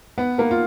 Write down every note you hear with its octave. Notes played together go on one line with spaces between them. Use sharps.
B3 B4
A#3 A#4
F4